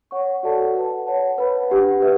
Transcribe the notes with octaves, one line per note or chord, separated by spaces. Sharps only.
C#5 F#5 C#6
F#4 A4 D5 F#5 A5
B4 F#5 A5
C#5 F#5 A5
B4 F#5 B5
D4 G4 B4 F#5
B4 E5